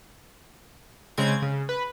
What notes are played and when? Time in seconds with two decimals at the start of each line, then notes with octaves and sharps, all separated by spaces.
1.18 C#3 G#3 C4 G#6
1.42 C#3
1.69 B4